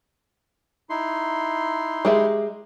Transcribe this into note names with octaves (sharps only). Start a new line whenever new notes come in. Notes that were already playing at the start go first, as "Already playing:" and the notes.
D#4 E4 C6
G#3 G4 E5